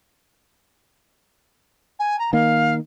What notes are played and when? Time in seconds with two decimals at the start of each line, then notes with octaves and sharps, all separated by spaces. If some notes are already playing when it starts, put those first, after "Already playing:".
1.99 G#5
2.19 A#5
2.33 D#3 A#3 F5